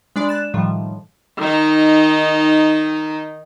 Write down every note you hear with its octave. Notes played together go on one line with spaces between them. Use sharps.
G#3 D4 D5 B5
F#6 A6 E7
A2 D#3 F3 G3
D#3 D#4